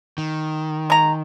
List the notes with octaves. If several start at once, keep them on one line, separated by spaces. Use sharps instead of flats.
D#3
G#3 A#5